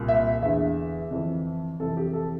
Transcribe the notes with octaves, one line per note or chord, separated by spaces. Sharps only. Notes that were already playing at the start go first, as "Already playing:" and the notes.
Already playing: C2 A#2
E5
E2 D3 E5
F2 E3
F2 C3 E3 A4
G4
A4